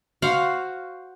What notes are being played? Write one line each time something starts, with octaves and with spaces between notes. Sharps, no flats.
F#4 C5 F5 F#5